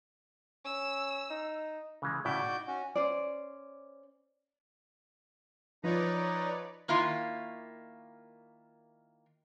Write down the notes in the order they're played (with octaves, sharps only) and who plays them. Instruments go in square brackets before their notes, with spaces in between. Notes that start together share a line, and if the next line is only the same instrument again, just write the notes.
[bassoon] C#4 [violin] E6
[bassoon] D#4
[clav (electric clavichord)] C#3 E3 G#3
[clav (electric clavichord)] A2 C#3 E4 [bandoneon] F#4 D5 G6
[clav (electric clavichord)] D#4
[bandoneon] C#4 F#4
[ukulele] C#4 C5 D5
[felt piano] F3 F4 [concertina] D#4 A#5 [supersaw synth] B4 C#5 D5
[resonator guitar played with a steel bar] D#3 A#3 E4 F4